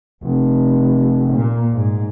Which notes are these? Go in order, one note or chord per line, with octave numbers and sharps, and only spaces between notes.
F1
A#2
G#2